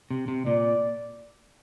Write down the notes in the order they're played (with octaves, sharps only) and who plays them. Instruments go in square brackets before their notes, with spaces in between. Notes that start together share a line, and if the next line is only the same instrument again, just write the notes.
[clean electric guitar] C3
C3
[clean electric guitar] A#2 [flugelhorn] D5